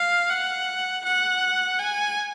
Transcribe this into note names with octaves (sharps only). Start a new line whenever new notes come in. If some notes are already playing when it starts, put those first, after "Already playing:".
Already playing: F5
F#5
F#5
G#5